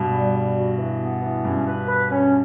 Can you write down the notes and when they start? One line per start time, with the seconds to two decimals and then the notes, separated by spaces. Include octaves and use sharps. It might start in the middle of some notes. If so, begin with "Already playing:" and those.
Already playing: G2 B2
0.11 G3
0.32 G3
0.55 F#4
0.77 E3
0.99 B3
1.21 E3
1.44 G2 C#4
1.66 B4
1.88 B4
2.10 C#4